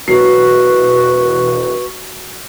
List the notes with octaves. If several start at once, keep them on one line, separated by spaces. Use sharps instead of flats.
E1 F#3 F#4 B4 C7